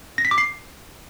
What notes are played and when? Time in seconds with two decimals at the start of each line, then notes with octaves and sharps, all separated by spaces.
0.18 A#6
0.25 B6
0.31 D6
0.38 C7